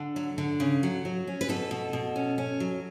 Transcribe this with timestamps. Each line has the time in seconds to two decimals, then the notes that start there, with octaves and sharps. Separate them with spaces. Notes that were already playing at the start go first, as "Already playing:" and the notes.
Already playing: D3 A4
0.16 F#3
0.38 D3
0.60 C#3
0.83 F#3
1.05 F#3
1.27 C#4
1.41 B4
1.49 B2 A4
1.71 B2
1.93 B2
2.16 C#4
2.38 C#4
2.60 F#3